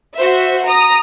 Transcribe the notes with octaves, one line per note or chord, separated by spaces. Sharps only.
F#4 C5 E5
A#5 D#6